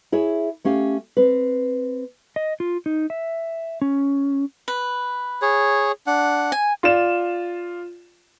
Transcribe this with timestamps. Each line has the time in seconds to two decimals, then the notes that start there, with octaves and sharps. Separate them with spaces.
0.12 E4 G#4 C#5 E5
0.65 A3 C#4 G4 F5
1.17 C4 B4
2.36 D#5
2.60 F4
2.86 D#4
3.10 E5
3.82 C#4
4.68 B4
5.42 G#4 C#5
6.07 D4 F#5
6.52 G#5
6.83 F4 D5 E7